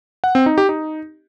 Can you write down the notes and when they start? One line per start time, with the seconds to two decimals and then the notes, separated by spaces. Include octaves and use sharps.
0.24 F#5
0.35 C4
0.46 D#4
0.58 G4
0.69 D#4